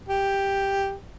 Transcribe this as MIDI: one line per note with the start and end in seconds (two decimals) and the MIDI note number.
0.09 0.93 67